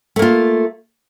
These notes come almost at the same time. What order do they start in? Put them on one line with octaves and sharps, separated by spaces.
A3 A#3 F4